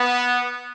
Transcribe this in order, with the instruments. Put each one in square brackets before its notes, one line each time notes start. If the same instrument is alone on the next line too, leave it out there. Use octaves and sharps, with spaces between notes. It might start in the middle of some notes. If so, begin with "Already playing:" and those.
Already playing: [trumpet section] B3